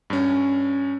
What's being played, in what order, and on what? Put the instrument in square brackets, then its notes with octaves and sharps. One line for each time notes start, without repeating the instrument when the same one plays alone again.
[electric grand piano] G2 C#4